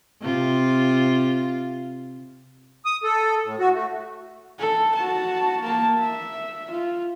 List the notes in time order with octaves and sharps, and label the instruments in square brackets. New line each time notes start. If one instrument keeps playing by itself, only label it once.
[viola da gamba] C3 F4
[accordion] D#6
A4
A2
F#4
A3
[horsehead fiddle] A4
F#4 A5
A#3 A5
E5
F4